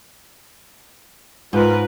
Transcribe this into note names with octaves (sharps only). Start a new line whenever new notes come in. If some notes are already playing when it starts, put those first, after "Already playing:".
G#2 F4 A#4 B4